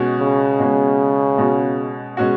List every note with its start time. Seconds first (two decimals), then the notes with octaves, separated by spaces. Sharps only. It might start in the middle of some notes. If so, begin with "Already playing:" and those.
Already playing: B2 G#3 C#4 F#4
0.20 C#3
0.60 B2 G#3 C#4 F#4
1.38 B2 G#3 C#4 F#4
2.17 B2 G#3 C#4 F#4